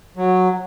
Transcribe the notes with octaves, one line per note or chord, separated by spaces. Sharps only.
F#3